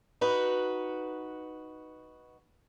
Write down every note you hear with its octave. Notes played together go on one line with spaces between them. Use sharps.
D#4 F#4 B4